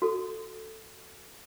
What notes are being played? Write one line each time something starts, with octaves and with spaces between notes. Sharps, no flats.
F#4 A4